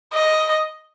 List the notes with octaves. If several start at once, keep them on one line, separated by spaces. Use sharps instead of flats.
D#5